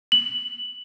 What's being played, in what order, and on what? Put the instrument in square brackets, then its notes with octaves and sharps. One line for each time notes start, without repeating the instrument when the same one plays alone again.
[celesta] F#7